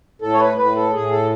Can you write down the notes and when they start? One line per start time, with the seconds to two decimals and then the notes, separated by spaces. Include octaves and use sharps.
0.22 A2 A4
0.34 C#5
0.39 B4
0.57 A2 B4
0.75 A4
0.93 A2 G#4
1.11 A4